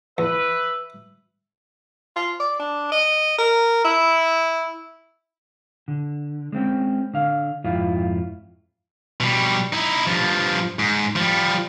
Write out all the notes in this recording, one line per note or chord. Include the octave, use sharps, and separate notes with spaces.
E2 B4 E5
F4
D5
D4
D#5
A#4
E4
D3
G#3 C4 C#4
D3 F5
F2 G#2 E4 F4
B2 G3
D#4 E4
G2 F3
G#2
F3 G3